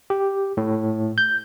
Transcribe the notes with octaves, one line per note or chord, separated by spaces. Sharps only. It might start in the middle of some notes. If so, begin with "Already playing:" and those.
G4
A2
G6